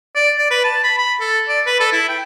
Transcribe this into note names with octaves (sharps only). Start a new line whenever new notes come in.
D5
D5
B4
A5
B5
B5
A4
D5
B4
A4
E4
G5